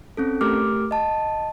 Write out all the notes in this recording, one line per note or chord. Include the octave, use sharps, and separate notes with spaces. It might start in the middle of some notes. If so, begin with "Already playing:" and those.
C4 C#4 A4
A3 G4 A#4 D6 F6
D#5 A5